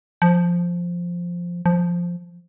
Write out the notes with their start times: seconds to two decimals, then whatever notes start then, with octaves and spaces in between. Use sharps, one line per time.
0.22 F3
1.66 F3